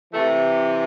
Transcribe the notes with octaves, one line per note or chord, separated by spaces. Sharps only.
C3 E3 A3